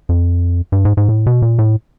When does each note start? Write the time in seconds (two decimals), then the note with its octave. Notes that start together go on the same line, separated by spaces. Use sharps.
0.09 F2
0.72 G2
0.85 G#2
0.97 G#2
1.09 A2
1.26 B2
1.42 A#2
1.59 A2